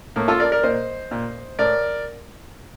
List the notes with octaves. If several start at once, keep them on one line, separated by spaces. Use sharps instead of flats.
A2 A#3
F4 A4
A#4 D5
A#4 D5
A#2 C5 D#5
A#2
A2 A#4 D5